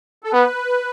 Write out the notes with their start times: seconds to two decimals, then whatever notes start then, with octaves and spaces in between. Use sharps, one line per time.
0.24 A4
0.32 B3 B4